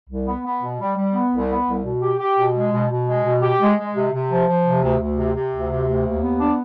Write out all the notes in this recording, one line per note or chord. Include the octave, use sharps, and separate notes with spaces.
C2
B3
B3
B2
G3
G3
B3
C2
B3
C2
B2
G4
G4
B2
G#3
B2
B2
G#3
B2
G4
G#3
G#3
C3
C3
F3
F3
C3
D2
D2
C3
C3
D2
C3
D2
D#2
B3
D4